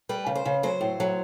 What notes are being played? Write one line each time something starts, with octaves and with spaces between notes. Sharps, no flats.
G3 B4
C#3
C5
C#3
F#3 C5
A2
F#3